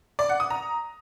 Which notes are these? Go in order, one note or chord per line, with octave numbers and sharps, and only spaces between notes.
D5
F#5
D#6
A#5